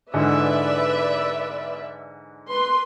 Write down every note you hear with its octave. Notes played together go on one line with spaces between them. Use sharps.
G#2 D3 E3 B4 D5 E5
B4 C6